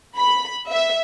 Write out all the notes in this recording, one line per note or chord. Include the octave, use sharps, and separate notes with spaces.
B5
E5